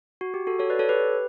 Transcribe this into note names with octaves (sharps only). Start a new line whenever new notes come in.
F#4
G4
F#4 A4
A4 C#5
B4 D5
A4 C#5
G4 B4